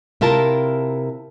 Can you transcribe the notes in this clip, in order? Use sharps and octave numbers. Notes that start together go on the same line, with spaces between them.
C3 E4 F4 A#4 A5